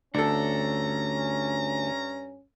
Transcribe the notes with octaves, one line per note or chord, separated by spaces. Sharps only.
D2 G2 C#4 D4 A4 A#5